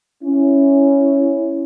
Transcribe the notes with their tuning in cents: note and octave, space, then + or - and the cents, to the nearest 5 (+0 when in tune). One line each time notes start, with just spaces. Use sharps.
C#4 +0 E4 +0